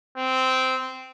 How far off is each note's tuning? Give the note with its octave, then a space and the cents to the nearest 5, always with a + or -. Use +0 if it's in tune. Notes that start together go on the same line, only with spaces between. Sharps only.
C4 -10